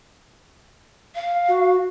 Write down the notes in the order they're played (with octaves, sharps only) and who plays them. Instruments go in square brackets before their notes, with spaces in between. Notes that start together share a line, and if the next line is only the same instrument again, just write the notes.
[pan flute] F5
[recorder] F#4